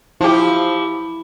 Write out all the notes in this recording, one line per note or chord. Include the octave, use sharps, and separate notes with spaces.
F3 E4 G4